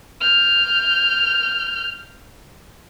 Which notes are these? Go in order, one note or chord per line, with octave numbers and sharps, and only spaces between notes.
F6 G6